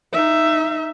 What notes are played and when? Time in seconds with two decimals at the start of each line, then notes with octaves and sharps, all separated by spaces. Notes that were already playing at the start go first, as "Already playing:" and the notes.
0.13 D#4 E5